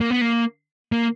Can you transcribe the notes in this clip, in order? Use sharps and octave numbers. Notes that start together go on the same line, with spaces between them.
A#3
B3
A#3
A#3